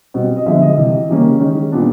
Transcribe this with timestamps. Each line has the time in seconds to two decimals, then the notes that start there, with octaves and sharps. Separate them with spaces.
0.14 B2 G3 C4
0.36 D#5
0.46 D3 F3 G#3 B3 E5
0.62 D#5
0.77 C3 E3 G3
1.09 C#3 E3 G3 A#3 C#4
1.40 D#3 G#3 C#4
1.72 A#2 G3 B3 D4